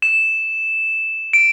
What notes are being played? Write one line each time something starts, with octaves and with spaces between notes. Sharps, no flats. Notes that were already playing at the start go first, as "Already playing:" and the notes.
E7
D7